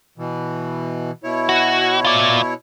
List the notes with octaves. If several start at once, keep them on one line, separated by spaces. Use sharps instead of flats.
B2 E3
B2 E4 C#5
F#4
F4 D5